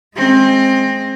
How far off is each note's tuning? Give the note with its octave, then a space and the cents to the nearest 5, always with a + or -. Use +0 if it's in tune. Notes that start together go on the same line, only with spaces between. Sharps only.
G#3 +15 C4 +20